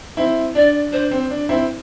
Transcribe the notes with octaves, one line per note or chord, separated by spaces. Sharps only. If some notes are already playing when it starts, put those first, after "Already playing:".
C4 E4
D4 D5
D4 C5
C4
D4
C4 E4